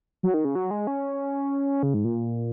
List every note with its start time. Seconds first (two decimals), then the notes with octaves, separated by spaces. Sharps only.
0.23 F#3
0.34 D#3
0.45 C#3
0.55 F#3
0.71 G#3
0.87 C#4
1.83 C#3
1.94 G#2
2.04 A#2